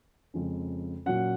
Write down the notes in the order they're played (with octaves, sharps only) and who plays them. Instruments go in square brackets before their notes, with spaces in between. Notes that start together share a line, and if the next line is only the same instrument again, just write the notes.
[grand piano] F2 C#3 F3 G#3 C#4
A#2 F#3 C#4 F#5